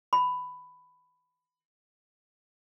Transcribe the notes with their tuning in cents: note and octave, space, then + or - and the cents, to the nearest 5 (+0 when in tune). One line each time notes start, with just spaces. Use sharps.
B5 +10